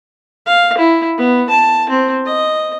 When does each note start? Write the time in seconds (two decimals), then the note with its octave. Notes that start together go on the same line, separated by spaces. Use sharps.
0.46 F5
0.77 E4
1.18 B3
1.49 A5
1.89 C4
2.25 D#5